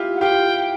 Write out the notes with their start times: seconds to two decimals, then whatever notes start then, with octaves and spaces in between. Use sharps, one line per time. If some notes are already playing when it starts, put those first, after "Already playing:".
Already playing: E4 F4 G4
0.16 F#5
0.21 F4 G4 G5